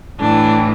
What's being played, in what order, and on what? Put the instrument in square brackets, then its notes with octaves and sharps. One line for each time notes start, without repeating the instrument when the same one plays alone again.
[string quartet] A2 E3 D4